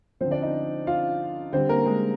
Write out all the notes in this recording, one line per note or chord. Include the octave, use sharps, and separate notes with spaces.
D3 F3 C4 C5
D4 D5
D#4 D#5
F4 F5
D3 G3 C4 C5
A#3 A#4
G#3 G#4